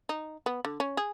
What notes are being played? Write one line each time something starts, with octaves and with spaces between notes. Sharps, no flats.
D#4
B3
D3
C#4
G#4